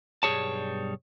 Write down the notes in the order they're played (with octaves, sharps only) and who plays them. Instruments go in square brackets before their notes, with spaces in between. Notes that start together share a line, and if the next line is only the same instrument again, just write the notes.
[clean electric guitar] B1 G2 G3 G#4 C#5 A5